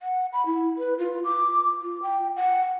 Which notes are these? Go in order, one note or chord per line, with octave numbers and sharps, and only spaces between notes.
F#5
B5
E4
B4
F4
D6
F4
G5
F#5